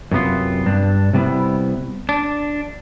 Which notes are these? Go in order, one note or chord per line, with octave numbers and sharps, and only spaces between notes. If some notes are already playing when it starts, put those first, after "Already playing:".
F#2 C3 B3 F4
G2 D4
C3 G3 B3 E4
D4